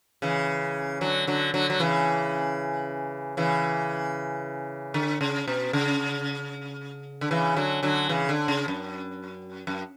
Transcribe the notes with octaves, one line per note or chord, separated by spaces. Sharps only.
C#3 E3
D3 F#3
D3 F#3
D3 F#3
F#3
C#3 E3
C#3 E3
D3
C#3
B2
C#3
D3
C#3 E3
D3 F#3
D3 F#3
C#3 E3
D3
C#3
F#2
F#2